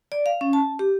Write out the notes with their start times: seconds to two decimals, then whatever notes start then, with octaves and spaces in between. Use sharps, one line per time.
0.12 D5
0.26 F5
0.41 C#4
0.53 A5
0.79 G4